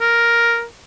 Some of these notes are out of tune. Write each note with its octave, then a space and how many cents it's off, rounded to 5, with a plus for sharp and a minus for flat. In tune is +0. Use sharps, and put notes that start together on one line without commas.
A#4 +5